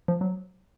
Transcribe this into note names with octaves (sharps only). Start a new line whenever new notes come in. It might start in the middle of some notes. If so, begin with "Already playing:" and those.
F3
F#3